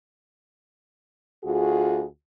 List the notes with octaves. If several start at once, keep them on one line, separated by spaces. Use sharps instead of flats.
D2 F4 F#4 G#4